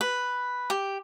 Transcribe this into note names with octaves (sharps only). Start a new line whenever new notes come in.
B4
G4